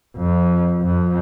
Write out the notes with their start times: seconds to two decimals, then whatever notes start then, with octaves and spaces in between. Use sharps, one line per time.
0.16 F2
0.81 F2